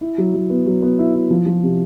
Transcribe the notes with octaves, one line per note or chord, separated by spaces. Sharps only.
E4
F#3
F#3
B3
F#3
B3
E4
E4
F3
F3
C3